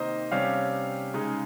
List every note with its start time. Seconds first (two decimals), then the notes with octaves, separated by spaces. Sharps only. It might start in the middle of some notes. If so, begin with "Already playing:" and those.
Already playing: C3 D#3 A#3 D#4 C5 D#5
0.32 C3 G3 C#4 C#5 F5
1.14 C#3 G#3 D#4